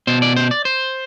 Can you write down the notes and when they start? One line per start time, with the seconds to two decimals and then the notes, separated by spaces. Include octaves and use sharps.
0.07 B2 C5
0.22 D5
0.36 C5
0.51 D5
0.65 C5